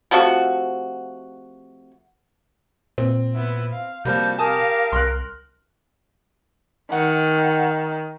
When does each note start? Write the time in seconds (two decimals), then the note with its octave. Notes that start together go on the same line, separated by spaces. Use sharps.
0.11 C3 F3 A3 F#4
2.98 A#2 C4
3.34 B3 E4
3.72 F5
4.05 C3 F3 G3 A#3 F#4 A5 G6
4.38 G4 A#4 F5 G#5 A5 D#6
4.92 C2 C6 F6 F#6
6.92 D#3 F#5